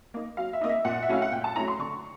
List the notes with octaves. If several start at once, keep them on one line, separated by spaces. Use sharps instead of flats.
A#3 D#4
F#3 F5
E5
A#3 D#4 D#5
E5
A#2 F#5
E5
F#3 A3 C#4 E4 F5
F#5
A#2 G5
A5
F#3 A3 C#4 E4 A#5
C6
D3 C#6